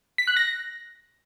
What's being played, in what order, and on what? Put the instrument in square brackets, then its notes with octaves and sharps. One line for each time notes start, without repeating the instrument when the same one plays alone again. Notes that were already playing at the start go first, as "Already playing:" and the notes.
[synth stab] B6
F#6
A#6